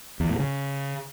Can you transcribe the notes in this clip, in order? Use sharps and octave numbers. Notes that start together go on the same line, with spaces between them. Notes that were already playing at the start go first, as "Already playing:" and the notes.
E2
A2
C#3